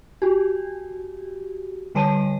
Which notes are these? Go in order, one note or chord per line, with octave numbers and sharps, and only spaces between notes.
F#4 G4
D3 G3 B4 C#5 A5 D#7